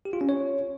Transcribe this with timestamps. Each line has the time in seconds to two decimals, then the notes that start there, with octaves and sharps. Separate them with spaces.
0.05 G4
0.13 F4
0.21 C#4
0.29 C#5